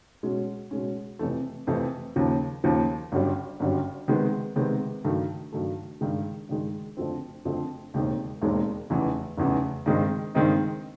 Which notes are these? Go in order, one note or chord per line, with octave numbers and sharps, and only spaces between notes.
B2 G#3 C#4
B2 G#3 C#4
F2 C3 E3 A3
F2 C3 E3 A3
D#2 C#3 F3
D#2 C#3 F3
G1 F#2 D3 G3
G1 F#2 D3 G3
C3 D#3 G#3 B3
C3 D#3 G#3 B3
G2 D#3 F#3 A3
G2 D#3 F#3 A3
G2 D#3 G#3
G2 D#3 G#3
F2 D3 F3 A3 C4
F2 D3 F3 A3 C4
E1 D#2 D#3 G#3 C4
E1 D#2 D#3 G#3 C4
F1 E2 C#3 E3
F1 E2 C#3 E3
G2 D#3 G#3 C4 D#4
G2 D#3 G#3 C4 D#4